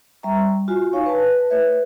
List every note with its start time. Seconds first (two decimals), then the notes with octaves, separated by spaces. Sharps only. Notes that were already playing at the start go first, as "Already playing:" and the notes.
0.23 G3 E5 A#5 C#6
0.68 F4 F#4 G#5
0.93 D#4 C#5 F5 G#5 C#6
1.06 B4 A5
1.50 A3 B4 C#5 E5